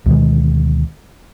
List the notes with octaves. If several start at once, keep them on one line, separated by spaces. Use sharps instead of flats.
D2 B2 D#3 G#3